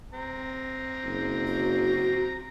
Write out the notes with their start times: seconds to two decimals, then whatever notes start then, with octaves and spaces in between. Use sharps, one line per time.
0.13 C4 A#5
1.04 F#1
1.47 F#4